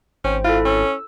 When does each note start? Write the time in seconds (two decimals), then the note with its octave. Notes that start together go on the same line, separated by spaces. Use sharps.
0.24 G#1 C#4 C5 G5
0.44 E4 F4 A4
0.65 C#4 E6